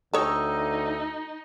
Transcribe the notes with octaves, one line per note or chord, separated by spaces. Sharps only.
D2 D#4 A4 C#5 G5 D#6 E6